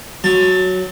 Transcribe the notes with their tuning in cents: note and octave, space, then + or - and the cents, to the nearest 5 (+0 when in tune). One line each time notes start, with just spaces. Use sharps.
F#3 +0 A5 +20